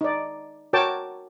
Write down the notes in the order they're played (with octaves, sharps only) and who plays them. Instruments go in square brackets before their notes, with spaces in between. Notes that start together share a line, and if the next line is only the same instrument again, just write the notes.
[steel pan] D#4 D5
F#4 A#4 C#5 G5 A5 D6